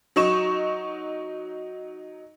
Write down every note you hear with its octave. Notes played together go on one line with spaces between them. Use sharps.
F#3 D#4 C#6 E7